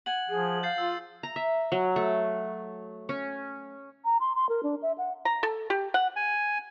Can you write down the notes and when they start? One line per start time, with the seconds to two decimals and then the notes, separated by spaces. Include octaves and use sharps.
0.06 F#5 G#5 F#7
0.30 F3 G#4
0.63 F5 G6 A6 C7
0.78 F4 E6
1.23 A#5
1.36 E5
1.72 F#3
1.96 A3
3.09 C#4
4.05 A#5
4.20 C6
4.35 C6
4.49 A#4
4.63 D4
4.82 E5
4.98 F#5
5.25 A#5
5.43 A4
5.70 G4
5.94 F#5
6.16 G#5